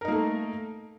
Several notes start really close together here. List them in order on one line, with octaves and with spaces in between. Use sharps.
A#4 D#4 A#3 A3